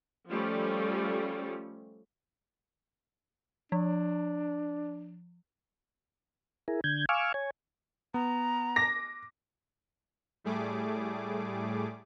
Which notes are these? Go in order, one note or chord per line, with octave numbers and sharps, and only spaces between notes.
F3 G3 A3 C#4 F4
F3 D4
E4 G#4 A#4
D3 G6 G#6
F5 G#5 C#6 D6 E6 F6
C#5 G#5
B3 A#5
D6 A#6
A2 G3 A3 G#4 D6